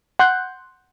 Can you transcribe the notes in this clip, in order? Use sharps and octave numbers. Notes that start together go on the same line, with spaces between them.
F#5 C6 F#6 G6